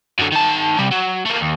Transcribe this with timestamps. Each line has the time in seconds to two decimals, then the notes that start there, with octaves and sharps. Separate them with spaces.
0.19 F#2 D3
0.32 D#3 A5
0.79 C3 G3
0.91 F#3
1.25 A3 A#3
1.40 D#2